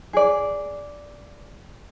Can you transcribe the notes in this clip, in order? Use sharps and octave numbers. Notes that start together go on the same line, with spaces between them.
G#4 D5